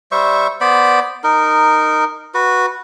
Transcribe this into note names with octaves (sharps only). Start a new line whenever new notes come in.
G3 C5 E5 C#6
B3 C5 D5 B5
D#4 A#4
F#4 B4